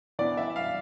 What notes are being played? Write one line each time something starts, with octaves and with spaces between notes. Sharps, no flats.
E3 B3 D4 D5
E5
F5